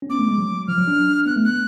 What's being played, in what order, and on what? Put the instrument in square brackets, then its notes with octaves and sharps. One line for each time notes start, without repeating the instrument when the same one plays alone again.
[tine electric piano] C#4
[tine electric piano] B3 [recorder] D6
[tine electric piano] A3
G#3
F#3
[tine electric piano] F3 [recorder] F6
[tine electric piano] F#3
D4
[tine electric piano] B3 [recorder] F#6
[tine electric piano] A3
[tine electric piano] B3 [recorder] F#6